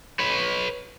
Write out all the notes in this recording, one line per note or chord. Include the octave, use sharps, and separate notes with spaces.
B4 C#5